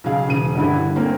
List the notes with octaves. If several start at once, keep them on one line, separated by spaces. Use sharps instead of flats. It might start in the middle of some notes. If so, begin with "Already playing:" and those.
B1 C#3 G#4 F5
E1 C#3 D#7
G2 D3 E4
A3 A#3 C4 C#4 A#4